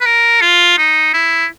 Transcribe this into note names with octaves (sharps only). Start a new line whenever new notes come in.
B4
A#4
F4
D#4
E4